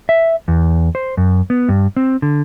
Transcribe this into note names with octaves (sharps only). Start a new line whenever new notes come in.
E5
E2
C5
F#2
B3
G2
C4
D3